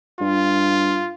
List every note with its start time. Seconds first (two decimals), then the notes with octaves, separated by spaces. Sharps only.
0.21 G2 F4